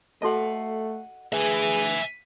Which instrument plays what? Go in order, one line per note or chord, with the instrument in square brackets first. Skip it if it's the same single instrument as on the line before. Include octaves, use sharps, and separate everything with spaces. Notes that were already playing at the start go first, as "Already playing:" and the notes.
[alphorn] A3 [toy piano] F#4 A4 A5 [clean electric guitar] D#5 F#5
[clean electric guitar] D2 B4 [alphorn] G#4 [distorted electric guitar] E5 G#5